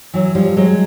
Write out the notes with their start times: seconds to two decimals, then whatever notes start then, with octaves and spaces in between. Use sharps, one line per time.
0.14 E3 F#3
0.35 F3 G3
0.56 F#3 G#3